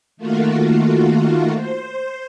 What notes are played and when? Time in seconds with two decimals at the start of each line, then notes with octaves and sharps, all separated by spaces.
0.17 D#3 A3 A#3 F4 F#4
1.55 C5